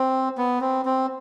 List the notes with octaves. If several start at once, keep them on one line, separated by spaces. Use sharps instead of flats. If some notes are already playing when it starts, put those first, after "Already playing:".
Already playing: C4
B3
C4
C4